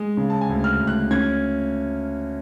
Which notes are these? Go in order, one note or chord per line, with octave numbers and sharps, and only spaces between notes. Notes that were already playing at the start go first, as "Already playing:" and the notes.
Already playing: G#3
C#3
A5
G#5
D2
F6
D2
F#6
C#4 G#6